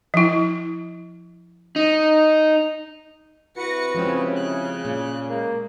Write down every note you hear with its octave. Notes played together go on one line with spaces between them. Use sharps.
F3 E4
D#4
C3 E4 F#4 B4 A#6 C#7
C#3 F3 G#3 C4
F#6
A#2 G#4
G#3 A#3